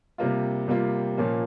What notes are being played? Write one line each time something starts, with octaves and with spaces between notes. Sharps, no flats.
C3 G3 A#3 F4
C3 G3 A#3 F4
A#2 F3 A#3 C#4